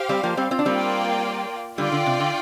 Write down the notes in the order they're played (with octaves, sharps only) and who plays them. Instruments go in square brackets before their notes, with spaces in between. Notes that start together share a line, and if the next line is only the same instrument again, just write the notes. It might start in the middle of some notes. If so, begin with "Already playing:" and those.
Already playing: [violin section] G4 C5 F5
[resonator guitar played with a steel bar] G3 C4
F3 A#3
G3 C4
C4 F4
D4
[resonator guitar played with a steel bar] G3 C4 [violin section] A#3 F4 D5 G5
[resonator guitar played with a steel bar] D3 G3 [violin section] F4 D5 G5
[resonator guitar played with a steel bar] D3
C3
D3